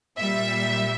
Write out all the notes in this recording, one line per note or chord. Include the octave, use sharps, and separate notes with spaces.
A#2 G3 E5